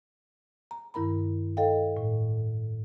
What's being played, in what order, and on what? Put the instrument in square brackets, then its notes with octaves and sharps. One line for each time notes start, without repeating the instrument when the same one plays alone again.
[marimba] A#5
G2 D#3 E4 A#4 A#5 B5
A4 D#5 F5 G5
A2